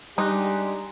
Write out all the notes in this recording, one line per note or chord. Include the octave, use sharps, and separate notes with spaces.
G3 G#3 D4 D#4 G4 C6 F#6